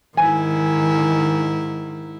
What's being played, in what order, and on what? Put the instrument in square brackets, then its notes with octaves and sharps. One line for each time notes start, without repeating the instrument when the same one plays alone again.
[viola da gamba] G#2 E4 [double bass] D#3 [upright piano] G#5